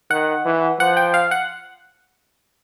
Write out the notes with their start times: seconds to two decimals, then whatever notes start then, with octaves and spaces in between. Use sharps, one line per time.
0.11 D#3 F#5
0.46 E3
0.79 F3 F#5
0.97 G5
1.14 F5
1.31 F#5